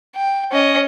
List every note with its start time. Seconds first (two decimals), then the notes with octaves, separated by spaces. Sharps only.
0.15 G5
0.52 C#4 D#5